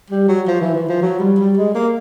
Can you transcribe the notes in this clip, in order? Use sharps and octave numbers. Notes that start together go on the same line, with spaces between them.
G3
F#3
F3
E3
E3
F3
F#3
G3
G3
G#3
A#3